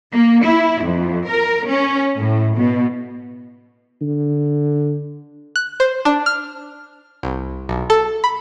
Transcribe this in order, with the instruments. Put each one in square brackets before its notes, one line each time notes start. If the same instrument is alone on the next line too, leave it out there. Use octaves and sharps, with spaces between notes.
[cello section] A#3
E4
F2
A#4
C#4
A2
B2
[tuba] D3
[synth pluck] F#6
C5
D4
F6
C2
B1
A4
B5